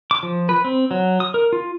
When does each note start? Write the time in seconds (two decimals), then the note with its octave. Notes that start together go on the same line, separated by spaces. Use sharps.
0.11 D6
0.23 F3
0.49 B4
0.65 C4
0.91 F#3
1.20 D#6
1.34 A#4
1.53 F4